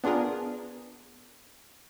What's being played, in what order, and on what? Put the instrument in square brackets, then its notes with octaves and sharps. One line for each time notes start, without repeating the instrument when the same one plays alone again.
[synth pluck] B3 D4 F4 G#4 A#4